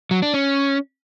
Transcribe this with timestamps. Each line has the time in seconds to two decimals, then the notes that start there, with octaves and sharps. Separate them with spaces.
0.11 F#3
0.22 D4
0.34 C#4